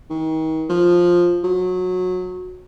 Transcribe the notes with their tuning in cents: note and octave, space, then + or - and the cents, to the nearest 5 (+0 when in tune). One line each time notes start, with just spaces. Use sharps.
D#3 +35
F3 +10
F#3 -20